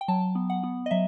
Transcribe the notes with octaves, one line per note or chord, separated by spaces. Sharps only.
G5
F#3 A5
B3
F#5
B3
D#5
F#3 E5